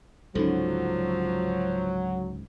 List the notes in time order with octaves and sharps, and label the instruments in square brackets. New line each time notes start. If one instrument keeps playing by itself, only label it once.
[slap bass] C#2 G#2 D3 [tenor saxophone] F3 [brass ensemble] F#3 [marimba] C#4 D#4 A4